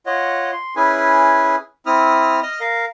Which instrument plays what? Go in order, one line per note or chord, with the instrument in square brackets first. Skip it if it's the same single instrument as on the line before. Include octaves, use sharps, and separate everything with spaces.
[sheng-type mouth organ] F4 C#5 D#5 F#5
C6
C#4 E4 G#4 B4 G#5
C4 E4 D#6 F6
D#5 D#6 F6
A#4 F5